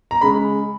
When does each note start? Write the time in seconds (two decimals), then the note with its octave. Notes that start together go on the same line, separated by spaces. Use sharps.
0.11 A#5
0.21 C#3 G#3 B5